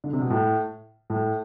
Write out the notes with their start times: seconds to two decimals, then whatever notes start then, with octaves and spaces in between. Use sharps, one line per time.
0.04 D3
0.13 C3
0.21 B2
0.30 A2
1.10 A2